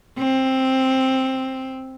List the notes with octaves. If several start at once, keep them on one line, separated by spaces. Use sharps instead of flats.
C4